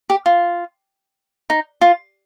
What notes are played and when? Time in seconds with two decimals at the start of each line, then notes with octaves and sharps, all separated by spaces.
0.10 G4
0.26 F4
1.50 D#4
1.81 F4